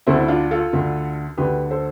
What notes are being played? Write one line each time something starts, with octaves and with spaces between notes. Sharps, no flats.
D2 D3 C4 E4
E4
D4 F4
F4 A4
D2 D3
D2 D3 G4 B4
A4 C5